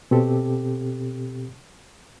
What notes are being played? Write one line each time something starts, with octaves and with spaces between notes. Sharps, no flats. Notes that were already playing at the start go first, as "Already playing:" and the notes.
B2 C4 G4 A4